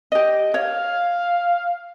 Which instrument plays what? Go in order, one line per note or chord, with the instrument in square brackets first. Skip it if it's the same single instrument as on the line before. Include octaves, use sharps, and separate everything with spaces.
[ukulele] G4 D#5
[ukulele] C#5 [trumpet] F5